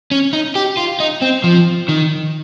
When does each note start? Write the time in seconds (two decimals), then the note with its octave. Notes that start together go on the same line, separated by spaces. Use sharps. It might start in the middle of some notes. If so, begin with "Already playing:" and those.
0.11 C#4
0.33 D#4
0.56 G4
0.77 F4
1.00 D#4
1.22 C4
1.44 F3
1.89 D#3